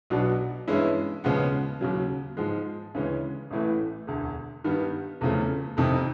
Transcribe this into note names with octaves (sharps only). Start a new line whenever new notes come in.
B1 B2 F#3 B3 D4
G2 E3 G#3 C#4 E4
D#2 C#3 F3 G#3 B3
D#2 C#3 F#3
G#2 F3 G#3
D2 C#3 E3 G#3 C#4
A1 A2 E3 A3
E1 D2 D3
G2 D#3 G3 B3
F1 E2 C#3 F3 A3
F1 F2 C3 D#3